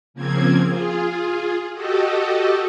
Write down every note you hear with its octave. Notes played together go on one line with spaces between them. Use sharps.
C#3 F3 A#3 C4 G#6
F4 G#4
F#4 G4 A4 D#5